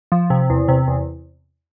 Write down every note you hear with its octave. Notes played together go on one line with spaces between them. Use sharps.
F3
C3
E2
C3
E2